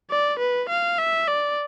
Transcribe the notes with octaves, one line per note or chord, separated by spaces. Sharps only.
D5
B4
F5
E5
D5